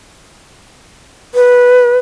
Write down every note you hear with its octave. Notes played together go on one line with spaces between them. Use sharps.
B4